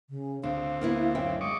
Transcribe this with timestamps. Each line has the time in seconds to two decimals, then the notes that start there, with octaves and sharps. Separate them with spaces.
0.10 C#3
0.44 D2 C4 D4 F5
0.81 A#3 B3 E4
1.15 F#2 E5 G5
1.41 G#3 D#5 C#6 D6